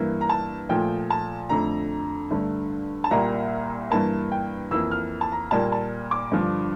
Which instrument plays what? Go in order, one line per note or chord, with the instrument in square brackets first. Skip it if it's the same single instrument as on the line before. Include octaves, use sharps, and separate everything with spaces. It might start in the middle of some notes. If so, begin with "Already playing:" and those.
Already playing: [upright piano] G2 E3 A#3
A#5
A5
A#2 F3 A3 G5
A5
F2 D3 A3 A#5
G2 D3 A3
A5
C2 A#2 G3 A#3 A#5
G2 E3 A#3 A5
G5
F2 E3 A#3 E6
F6
A5
A#5
A#2 G3 A#3 A5
A5
D6
G2 D3 F3